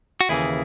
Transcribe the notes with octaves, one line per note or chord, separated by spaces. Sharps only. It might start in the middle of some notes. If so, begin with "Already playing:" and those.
F#4
D#2 C#3 E3 E4 G#4